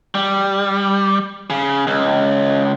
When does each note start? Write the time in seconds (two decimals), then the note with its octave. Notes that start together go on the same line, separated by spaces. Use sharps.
0.15 G3
1.50 C#3
1.87 C#2